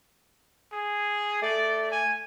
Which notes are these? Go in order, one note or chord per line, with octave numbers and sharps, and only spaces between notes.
G#4
A3 D5
G#5